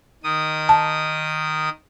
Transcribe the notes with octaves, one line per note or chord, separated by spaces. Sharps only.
D#3 D#6
A5